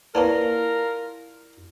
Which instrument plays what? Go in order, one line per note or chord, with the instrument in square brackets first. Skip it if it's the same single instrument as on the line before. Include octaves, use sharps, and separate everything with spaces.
[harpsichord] A#3 B3 C#4 [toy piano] E4 D5 A5 [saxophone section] F4 A#4